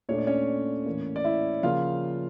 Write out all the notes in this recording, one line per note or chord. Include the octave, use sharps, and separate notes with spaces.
A#2 A3 D4 C#5
D5
C#4 C#5
A2 E3 A#3
D5
E4 E5
C#3 F3 A#3 F4 F5